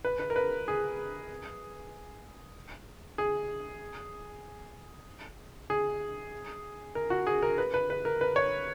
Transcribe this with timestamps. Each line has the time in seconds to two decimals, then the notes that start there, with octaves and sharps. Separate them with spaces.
0.05 B4
0.20 B4
0.30 A#4
0.36 B4
0.68 G#4
3.18 G#4
5.70 G#4
6.95 A#4
7.10 F#4
7.27 G#4
7.43 A#4
7.58 B4
7.74 B4
7.90 B4
8.05 A#4
8.21 B4
8.36 C#5